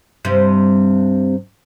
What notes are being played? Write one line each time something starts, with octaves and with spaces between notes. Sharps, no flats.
G2 C3